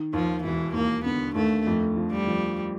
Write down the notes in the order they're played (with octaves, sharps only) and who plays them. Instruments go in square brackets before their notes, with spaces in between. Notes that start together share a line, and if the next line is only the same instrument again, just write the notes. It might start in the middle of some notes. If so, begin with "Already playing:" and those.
Already playing: [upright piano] D#3
[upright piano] D#2 [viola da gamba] F3
[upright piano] E1 [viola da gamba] E3
[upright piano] D#2 [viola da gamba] A#3
[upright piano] D3 [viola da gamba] B3
[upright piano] D#2 [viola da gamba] A3
[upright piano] F2
F3
[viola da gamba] G3
[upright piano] F3